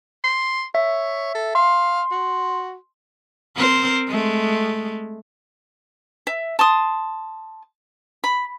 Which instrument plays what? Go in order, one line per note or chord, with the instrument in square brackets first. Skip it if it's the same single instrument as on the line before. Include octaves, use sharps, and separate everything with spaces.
[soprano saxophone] C6
[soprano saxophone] C#5 [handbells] E5
[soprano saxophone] A4
[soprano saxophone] F5 [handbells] C6
[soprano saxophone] F#4
[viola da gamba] C4 A#4 C5
G#3 A3
[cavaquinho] E5
A5 C6 D#6
B5